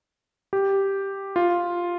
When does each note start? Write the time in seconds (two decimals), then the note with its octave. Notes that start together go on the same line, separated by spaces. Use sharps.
0.53 G4
1.36 F4